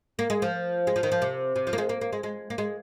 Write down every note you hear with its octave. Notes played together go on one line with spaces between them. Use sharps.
A#3
G#3
F3
G#3
F3
D#3
F3
C3
C3
F3
A#3
G#3
A#3
A#3
G#3
G#3
A#3
G#3